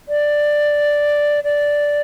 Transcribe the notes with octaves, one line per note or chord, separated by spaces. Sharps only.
D5
D5